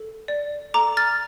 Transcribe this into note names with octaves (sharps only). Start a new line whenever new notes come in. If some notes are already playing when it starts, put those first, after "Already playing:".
Already playing: A4
D5
A4 A#5 D6
F6 A6